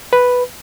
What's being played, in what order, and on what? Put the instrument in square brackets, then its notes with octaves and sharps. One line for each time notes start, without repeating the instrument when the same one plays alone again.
[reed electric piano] B4